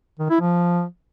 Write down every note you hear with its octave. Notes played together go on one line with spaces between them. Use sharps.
D#3
E4
F3